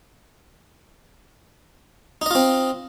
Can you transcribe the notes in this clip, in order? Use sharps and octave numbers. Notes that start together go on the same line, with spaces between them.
C4 D#4 F4 D#5